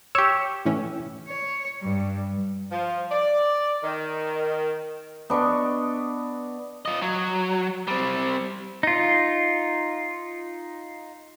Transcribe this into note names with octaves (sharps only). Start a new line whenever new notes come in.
G4 C#5 C#6 E6
A2 E3 C#4
C#5
G2
F3
D5
D#3
B3 D4 D#5 C#6
F4 D#5
F#3
G3 C4
D#4 F4